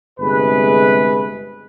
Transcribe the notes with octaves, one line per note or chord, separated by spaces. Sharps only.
G1 C3 G#3 G#4 B4